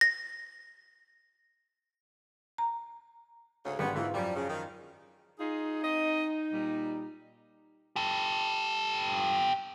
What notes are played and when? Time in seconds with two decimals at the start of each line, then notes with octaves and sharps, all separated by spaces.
0.01 A#6
2.58 A#5
3.65 D2 G#2 C#3
3.79 G#1 D3 G3 B3
3.95 G#2 B2 D#3 E3 B3 F4
4.14 F#2 F3 G3 G5
4.36 C#3
4.49 D#3
5.39 D#4 F4 G#4
5.83 C4 D#5
6.53 A#2 G3
7.96 G4 A4